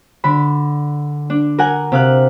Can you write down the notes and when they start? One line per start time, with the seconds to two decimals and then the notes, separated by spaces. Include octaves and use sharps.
0.24 D3 B5
1.30 D4
1.58 A#4 F#5 G#5
1.92 C3 F5 F#6